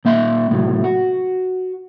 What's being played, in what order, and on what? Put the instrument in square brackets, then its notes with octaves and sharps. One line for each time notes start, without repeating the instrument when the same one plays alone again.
[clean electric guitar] A#2 A#3 E5 F#5 C6
C#2 A2 C3 E3 F#3
F#4